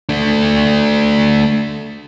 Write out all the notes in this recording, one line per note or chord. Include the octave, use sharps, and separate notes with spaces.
A3 D4